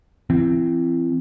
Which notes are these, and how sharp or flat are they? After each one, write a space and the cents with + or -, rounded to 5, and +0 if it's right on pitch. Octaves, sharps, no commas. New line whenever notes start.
E3 +35 C4 +0